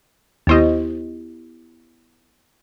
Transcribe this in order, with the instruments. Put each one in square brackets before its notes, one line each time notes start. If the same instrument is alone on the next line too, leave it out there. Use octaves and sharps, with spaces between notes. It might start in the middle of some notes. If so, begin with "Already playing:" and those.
[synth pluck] D#2 C5 D#5 [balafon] B3 E4 G4